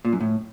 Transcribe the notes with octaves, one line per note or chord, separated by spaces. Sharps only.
A#2
F#2
A2